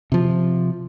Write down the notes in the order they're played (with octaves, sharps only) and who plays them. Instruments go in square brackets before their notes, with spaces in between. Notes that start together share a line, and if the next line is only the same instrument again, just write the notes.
[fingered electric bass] C3 F3